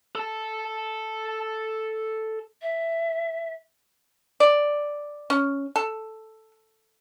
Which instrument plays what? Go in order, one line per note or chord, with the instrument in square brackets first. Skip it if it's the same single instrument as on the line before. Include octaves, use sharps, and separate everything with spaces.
[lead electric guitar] A4 A5
[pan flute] E5
[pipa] D5
C#4
A4